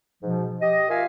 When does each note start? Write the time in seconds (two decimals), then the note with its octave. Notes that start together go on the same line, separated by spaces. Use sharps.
0.22 G#2 B2 F3
0.61 G4 D#5
0.89 F4 A#4 E5 F5 G#5